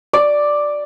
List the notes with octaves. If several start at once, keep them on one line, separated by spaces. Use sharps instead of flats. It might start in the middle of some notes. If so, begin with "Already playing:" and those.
D5